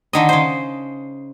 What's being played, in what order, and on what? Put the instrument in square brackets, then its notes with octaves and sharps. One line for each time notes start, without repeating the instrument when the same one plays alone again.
[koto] D3 D#3 D#5
C#3 C5